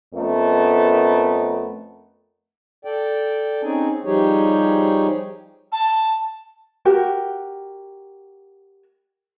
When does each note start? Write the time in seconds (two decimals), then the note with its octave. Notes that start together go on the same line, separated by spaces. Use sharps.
0.14 F2 A3 B3 C#4 A#4
2.85 A4 D5 G5
3.63 C4 C#4 D#4 G#4 G#5
4.05 F3 G3 D#4 G4 G#4 C#5
5.72 A5
6.85 F#4 G4 A#4